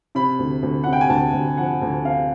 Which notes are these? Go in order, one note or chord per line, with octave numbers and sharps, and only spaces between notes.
C3 B5
D2
D2
C3 F#5
G5
G#5
D2 A5
D2
F3 F#5
D2
C3 F5